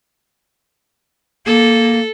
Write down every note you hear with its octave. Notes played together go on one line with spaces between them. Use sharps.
A#3 A4